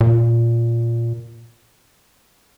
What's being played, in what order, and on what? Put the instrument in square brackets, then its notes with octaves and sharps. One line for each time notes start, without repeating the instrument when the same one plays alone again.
[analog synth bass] A#2